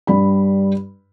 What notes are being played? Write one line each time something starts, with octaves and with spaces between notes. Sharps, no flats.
G2 G3 B5